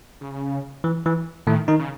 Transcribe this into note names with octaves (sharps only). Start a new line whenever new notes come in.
C#3
E3
E3
A2 D#3 A3
D#3 D#4
C#3